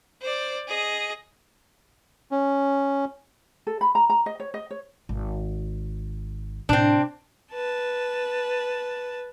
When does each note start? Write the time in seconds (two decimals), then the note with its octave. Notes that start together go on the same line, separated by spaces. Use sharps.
0.22 C5 D5
0.68 G#4 D#5
2.32 C#4
3.67 A4
3.81 B5
3.95 A#5
4.10 A#5
4.26 D#5
4.40 C#5
4.54 D#5
4.71 C#5
5.09 G#1
6.69 A2 C3 C4 D4
7.53 B4 A5